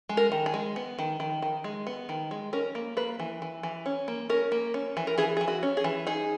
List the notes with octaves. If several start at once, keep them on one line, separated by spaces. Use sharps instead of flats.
G#3
A#4
D#3
G#4
G#3
B3
D#3
D#3
D#3
G#3
B3
D#3
G#3
C#4 A#4
A#3
A#3 B4
E3
E3
E3
C#4
A#3
C#4 A#4
A#3
C#4
E3
A#4
E3 G#4
E3 G#4
F#4
C#4
G#4
E3
D#4 G#4